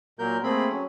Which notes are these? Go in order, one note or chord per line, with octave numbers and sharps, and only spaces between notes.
A#2 F#3 A#3 A#4 G6
A3 A#3 C4 G#4 B5
F#3 C#4